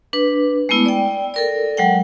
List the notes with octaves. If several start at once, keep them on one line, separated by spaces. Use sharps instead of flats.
D4 B4
G#3 A3 B3 E4
D5 G5
A4 A#4 D5
F#3 G#3 F#5 G5